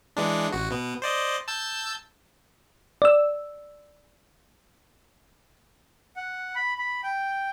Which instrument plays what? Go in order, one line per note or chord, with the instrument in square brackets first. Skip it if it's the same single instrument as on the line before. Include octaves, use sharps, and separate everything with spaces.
[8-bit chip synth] E3 G#3 D4
A1 F#4
B2 B3
C5 D5 D#5
A5 E6 G6
[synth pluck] D5 E6
[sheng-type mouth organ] F#5
B5
B5
G5